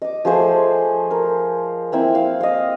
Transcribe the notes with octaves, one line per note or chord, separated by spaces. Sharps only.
D#5 D6
F3 A3 G#4 C5
A#4
A#3 C4 E4
F5
D#5 F5